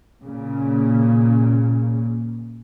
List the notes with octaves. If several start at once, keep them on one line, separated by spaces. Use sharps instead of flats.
A#2 C#3